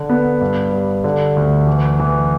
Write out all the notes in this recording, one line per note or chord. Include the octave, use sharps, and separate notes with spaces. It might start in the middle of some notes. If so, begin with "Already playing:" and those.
Already playing: D3
B3
G2
G3
D3
D2
E3
E3